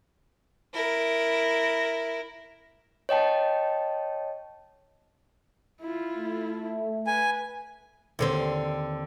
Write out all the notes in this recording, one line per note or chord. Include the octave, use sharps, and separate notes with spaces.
E4 A#4
C#5 D#5 G5 A5
E4 F4
A3
B4 G#5
D#2 D3 C4